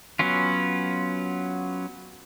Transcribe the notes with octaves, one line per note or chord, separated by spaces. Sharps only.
F#3 B3 C#4 F4